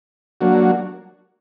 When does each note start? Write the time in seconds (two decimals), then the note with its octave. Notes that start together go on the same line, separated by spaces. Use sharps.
0.41 F#3 A#3 D4 F#4